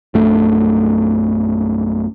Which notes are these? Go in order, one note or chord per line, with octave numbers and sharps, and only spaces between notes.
A#1 F#2 A3 D4